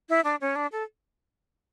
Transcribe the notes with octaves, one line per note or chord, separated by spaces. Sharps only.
E4
D4
C#4
D4
A4